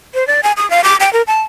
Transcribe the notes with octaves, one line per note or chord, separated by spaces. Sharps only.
C5
D5
G#5
D#6
F5
D6
G5
A#4
A5